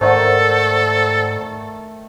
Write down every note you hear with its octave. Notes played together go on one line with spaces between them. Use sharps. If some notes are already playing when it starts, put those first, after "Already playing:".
G#2 D#3 A3 D#4 A4 C5 D5 F#5